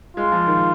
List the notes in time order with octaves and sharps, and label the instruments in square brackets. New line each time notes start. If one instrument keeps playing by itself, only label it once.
[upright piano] G#3 [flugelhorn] F4
[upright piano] F3
D#3